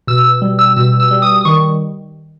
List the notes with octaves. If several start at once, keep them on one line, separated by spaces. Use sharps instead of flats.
B2 E6
E6
G3
E6
B2 E6
E6
G3
D#6
D#6
D#3 C#6